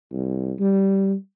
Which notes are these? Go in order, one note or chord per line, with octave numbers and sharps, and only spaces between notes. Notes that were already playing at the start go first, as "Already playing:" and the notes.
C2
G3